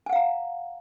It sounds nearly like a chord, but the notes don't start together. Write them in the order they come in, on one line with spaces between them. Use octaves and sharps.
G#5 F#5 F5 A#5